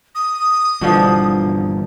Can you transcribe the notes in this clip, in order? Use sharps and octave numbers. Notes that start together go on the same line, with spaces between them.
D#6
G1 G2 B2 D3 E3 F3